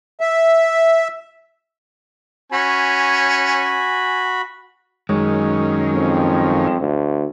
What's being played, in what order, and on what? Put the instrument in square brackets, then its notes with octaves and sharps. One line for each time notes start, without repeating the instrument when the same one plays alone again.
[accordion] E5
[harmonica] C#4 [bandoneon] F#4 B5 [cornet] G#5
[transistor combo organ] F#2 D#3 C#4 [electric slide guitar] G#3
[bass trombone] F2
D2